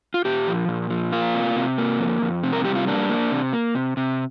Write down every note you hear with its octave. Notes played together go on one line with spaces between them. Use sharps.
F4
A#2 G4
F3
A#2
F3
A#3 F4
C3
C3
A#3
F2
F2
C3
A#4
G3 G4
F4
A#3 D4
A#3
C3
A#3
C3
C3